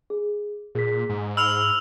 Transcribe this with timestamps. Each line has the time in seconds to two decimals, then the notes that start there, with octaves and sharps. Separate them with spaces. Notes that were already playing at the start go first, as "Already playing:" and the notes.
0.10 G#4
0.75 A#2 G#4 B6
1.09 G#2
1.37 B5 E6 F6 F7